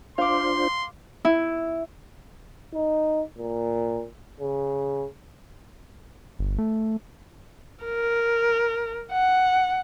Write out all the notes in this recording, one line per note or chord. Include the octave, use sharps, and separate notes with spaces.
D4 F4 C5 F5 C6 D6
E4
D#4
A#2
C#3
G1
A3
A#4
F#5